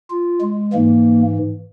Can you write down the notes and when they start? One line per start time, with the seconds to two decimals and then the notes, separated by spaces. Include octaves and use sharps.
0.10 F4
0.41 G#3
0.73 G#2 E3 A#3